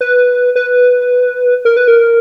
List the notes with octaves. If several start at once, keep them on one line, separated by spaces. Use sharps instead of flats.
B4
B4
A#4
B4
A#4